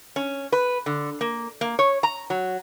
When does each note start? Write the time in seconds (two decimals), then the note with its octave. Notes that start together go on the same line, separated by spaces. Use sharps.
0.16 C#4
0.52 B4
0.86 D3
1.21 A#3
1.61 A#3
1.79 C#5
2.03 A#5
2.30 F#3